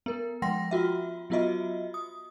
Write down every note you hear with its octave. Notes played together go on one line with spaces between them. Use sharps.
B3 A#4
F3 G#3 F#5 G5 C6 A#6
F4 F#4 E5
F#3 B3 F4 F#4 D#5 E5
D#6